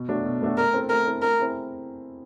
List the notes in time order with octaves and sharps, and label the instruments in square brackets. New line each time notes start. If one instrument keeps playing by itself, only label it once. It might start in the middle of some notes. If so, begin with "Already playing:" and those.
Already playing: [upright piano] B2
F#3 A3 D4 F#4
B2
F#3 A3 D4 F#4
[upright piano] A3 [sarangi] A#4
[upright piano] C4 E4 A4
[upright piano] A3 [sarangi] A#4
[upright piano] C4 E4 A4
[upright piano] A3 [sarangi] A#4
[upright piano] C4 E4 G#4